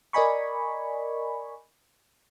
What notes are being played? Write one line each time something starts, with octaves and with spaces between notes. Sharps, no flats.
A#4 D5 D#5 G#5 B5 C#6